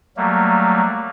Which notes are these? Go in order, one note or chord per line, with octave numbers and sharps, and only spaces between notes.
F#3 G3 A3 A#3